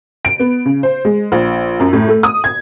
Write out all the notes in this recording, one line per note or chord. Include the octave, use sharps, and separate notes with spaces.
D7
B3
C#3
C5
G#3
A#1
F#2
A2
A3
D#6
G#6